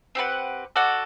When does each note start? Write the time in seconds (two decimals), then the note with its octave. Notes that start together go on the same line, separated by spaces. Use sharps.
0.15 C4 G4 B4 F#5
0.76 F#4 A4 D5 F#5